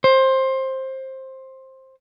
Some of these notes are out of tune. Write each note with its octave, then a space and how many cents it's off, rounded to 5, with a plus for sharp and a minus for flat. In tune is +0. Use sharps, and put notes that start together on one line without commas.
C5 +15